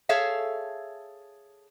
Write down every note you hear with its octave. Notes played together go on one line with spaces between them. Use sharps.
G#4 A4 C#5 E5 F5